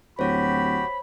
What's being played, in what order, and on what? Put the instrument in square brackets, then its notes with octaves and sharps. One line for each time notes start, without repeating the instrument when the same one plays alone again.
[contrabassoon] D1 [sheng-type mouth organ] F#4 G4 [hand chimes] C5 C#5 [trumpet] B5